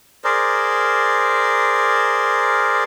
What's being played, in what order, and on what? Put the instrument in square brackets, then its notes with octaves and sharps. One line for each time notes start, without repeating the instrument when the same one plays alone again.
[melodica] G#4 A#4 C5 D5